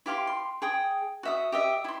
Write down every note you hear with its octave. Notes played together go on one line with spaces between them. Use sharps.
E4 G4 F5 C6
C6
G#4 G5 D#6
F#4 E5 D#6
G4 D#5 E5
E4 C6